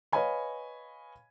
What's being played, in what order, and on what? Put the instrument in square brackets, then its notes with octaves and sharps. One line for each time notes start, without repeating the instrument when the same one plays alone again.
[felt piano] B4 C#5 D#5 F5 G#5 B5